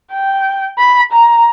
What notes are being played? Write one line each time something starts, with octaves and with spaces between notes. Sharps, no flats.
G5
B5
A#5